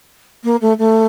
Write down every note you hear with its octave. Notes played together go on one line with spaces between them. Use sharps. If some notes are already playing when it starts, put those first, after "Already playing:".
A#3
A3
A3